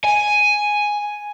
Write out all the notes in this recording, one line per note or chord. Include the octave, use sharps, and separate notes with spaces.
G#5